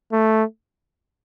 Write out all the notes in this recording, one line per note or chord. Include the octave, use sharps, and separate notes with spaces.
A3